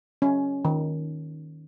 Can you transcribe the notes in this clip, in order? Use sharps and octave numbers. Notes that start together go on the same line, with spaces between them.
C#4
D#3